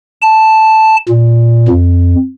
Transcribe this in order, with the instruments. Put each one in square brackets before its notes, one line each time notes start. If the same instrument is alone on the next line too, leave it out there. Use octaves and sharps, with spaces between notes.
[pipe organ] A5
A#2
F2